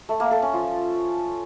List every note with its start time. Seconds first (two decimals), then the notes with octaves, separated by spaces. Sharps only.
0.09 A3
0.20 A#3
0.31 A4
0.42 C#4
0.53 F3